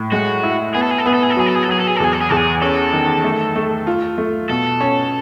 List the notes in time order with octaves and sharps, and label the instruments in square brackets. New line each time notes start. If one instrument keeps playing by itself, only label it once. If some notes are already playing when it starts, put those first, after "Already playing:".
Already playing: [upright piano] A2
[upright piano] G#3 [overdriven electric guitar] F#4
[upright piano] E4
[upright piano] B3 [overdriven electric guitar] G#4
[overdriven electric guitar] A4
G#4
A4
[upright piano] B3 [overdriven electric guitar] G#4
[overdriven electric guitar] A4
G#4
A4
[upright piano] F#3 [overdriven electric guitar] G#4
[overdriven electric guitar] A4
G#4
A4
[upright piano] F#3 [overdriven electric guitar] G#4
[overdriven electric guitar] A4
G#4
A4
[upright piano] E2 [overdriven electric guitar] G#4
[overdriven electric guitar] A4
G#4
[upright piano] E2 [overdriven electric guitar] A4
[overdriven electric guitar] G#4
[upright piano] C#4 [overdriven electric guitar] A4
[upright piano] D#3
A3
A3
F4
A3
[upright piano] B2 [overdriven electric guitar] A4
[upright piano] C#4